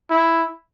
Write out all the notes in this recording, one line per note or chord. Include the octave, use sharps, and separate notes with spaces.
E4